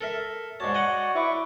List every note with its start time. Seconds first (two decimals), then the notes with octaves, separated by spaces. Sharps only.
0.01 A4 A#4 E5
0.60 G#2 F#4 C#5 D5 A5
0.75 D#5 F#5
1.15 E4 B4 C#6 D6